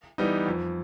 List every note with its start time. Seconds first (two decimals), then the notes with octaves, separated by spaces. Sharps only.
0.18 E3 G3 B3 D#4
0.47 F2